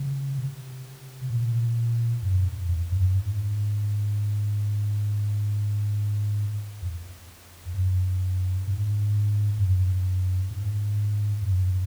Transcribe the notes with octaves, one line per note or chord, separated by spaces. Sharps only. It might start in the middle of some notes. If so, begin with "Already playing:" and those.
Already playing: C#3
C3
A#2
F#2
F2
F2
F#2
G#2
F2
F#2
G#2
F#2
G#2
F#2